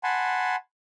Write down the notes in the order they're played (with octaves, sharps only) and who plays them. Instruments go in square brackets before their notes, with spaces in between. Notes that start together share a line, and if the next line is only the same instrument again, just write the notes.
[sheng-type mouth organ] F#5 G#5 A5 B5 C6